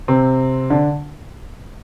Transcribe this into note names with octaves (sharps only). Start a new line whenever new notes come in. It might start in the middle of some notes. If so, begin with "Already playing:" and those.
C3 C4
D3 D4